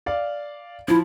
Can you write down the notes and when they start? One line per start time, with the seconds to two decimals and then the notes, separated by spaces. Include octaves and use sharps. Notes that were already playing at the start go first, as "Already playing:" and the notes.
0.06 D5 F5
0.88 F3 E4